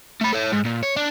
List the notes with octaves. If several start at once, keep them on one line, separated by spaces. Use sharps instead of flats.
A3 B5
A4 C#5
G#2
A#2
C#5
D4